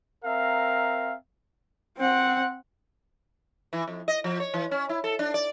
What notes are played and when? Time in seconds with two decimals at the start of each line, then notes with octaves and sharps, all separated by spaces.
0.25 C4 A#4 E5 F5 A#5
1.98 C4 F#5
3.73 E3
3.88 F2
4.08 D#5
4.24 F3
4.40 C#5
4.54 E3
4.71 C#4
4.89 E4
5.04 A4
5.19 D4
5.34 D5